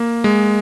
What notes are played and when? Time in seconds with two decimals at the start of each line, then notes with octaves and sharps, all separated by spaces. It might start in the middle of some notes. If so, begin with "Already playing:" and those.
Already playing: A#3
0.24 G#3